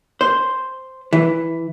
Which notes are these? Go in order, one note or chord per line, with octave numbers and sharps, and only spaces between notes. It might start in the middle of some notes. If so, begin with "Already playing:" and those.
C5
E3